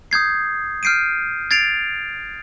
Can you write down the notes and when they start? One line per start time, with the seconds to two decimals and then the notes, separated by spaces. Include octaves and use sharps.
0.11 D#6 G6 G#6 C7
0.83 F6 G6 C7 D7 D#7
1.51 G#6 A6 C7 D7 F7